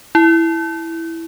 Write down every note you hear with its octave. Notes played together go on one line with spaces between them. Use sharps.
E4